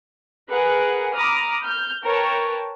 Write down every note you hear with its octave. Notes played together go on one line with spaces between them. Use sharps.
G#4 A#4 B4 F#5
A#5 B5 D6 D#6 F6
F6 G6
A#4 B4 C#5 G5 A5